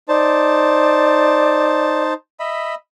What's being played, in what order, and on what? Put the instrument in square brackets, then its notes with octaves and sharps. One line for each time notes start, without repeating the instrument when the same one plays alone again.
[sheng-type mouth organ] D#4 C5 A5 [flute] D5
[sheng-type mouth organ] D#5 E5 B5